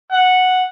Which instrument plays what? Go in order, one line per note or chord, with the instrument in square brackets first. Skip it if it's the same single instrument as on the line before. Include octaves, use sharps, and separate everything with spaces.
[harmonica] F#5